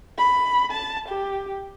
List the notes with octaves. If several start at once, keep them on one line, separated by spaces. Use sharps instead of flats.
B5
A5
G4